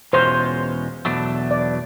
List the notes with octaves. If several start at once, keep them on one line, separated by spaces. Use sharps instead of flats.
E2 B2 G#3 C#4 F4 C5
E2 B2 F#3 A3 D4
D5